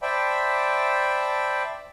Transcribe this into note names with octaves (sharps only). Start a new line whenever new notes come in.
C5 D5 E5 G5 A5 B5